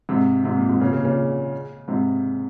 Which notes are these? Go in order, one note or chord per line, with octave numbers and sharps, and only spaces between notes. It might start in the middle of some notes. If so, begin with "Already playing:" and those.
G#2 C3
G#2 C3
A#2
G#2 C3
A#2 C#3
A#2 C#3
A#2 C#3
G#2 C3